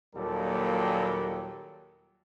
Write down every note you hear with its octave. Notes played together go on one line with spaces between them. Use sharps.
D#2 A#2 F#3 G3 G4 A4